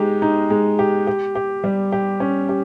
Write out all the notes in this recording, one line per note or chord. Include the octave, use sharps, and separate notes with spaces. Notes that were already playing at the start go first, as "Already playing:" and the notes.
Already playing: G#3 D#4 G4
D#4
G#3
G4
G4
G4
G3
G4
C#4
G4